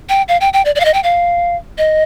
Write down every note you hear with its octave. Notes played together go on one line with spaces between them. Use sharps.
G5
F5
G5
G5
D5
D5
F5
D#5
G5
F5
D#5